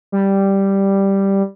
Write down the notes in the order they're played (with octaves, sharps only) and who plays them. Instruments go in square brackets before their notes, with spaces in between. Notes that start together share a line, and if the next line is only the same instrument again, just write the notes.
[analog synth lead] G3